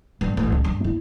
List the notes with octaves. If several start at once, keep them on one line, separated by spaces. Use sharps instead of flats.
G2
A1
C#2
G2
E4